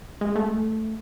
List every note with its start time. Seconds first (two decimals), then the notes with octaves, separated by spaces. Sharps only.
0.21 G#3
0.36 A3